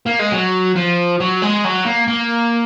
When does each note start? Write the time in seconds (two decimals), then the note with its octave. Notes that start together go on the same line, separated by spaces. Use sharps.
0.06 A#3
0.19 G#3
0.32 F#3
0.76 F3
1.20 F#3
1.42 G#3
1.65 F#3
1.85 A#3
2.08 A#3